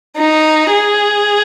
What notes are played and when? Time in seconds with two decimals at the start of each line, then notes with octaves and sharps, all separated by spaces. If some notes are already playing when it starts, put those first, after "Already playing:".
0.17 D#4
0.72 G#4